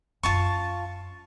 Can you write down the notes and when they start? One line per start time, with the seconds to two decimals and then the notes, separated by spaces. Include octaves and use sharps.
0.23 F#2 C#4 F4 A5 C#6